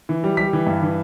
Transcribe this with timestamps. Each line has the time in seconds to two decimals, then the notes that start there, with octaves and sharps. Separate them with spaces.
0.09 E3
0.24 G3
0.37 G3 B6
0.53 E3
0.67 G2
0.82 E3